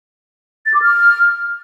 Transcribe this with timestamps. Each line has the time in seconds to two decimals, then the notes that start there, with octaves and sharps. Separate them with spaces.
0.66 A6
0.74 D6
0.82 F6